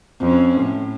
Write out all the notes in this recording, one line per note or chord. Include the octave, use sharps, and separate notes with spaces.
F2 C#4
A2